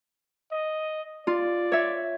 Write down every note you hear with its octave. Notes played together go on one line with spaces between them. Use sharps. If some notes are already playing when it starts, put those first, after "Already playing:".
D#5
F4 D5
C#5 E5